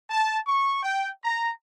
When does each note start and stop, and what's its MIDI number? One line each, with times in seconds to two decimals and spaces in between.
0.10 0.38 81
0.46 0.79 85
0.82 1.09 79
1.22 1.49 82